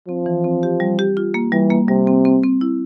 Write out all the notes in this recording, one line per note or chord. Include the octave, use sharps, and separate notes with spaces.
F3 C4
E3
C4
G4
G3
G4
F4
A#3
E3 G3
A#3
C3 G3
C4
C4
C4
E4